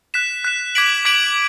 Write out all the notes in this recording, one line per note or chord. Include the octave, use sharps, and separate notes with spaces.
F#6 B6 E7
F#6 B6 E7
D6 G#6 B6 D7 F#7
D6 G#6 B6 D7 F#7